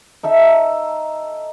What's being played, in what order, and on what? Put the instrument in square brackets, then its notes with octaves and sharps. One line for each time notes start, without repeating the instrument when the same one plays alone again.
[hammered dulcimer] D#4 A4 E5